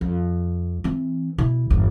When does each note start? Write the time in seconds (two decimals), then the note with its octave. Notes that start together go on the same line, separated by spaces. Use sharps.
0.01 F2
0.84 E3 C4
1.38 B2 E4
1.70 G1 E2